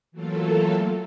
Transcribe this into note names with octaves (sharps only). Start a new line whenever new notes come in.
E3 F#3 A3 A#3 F4 A4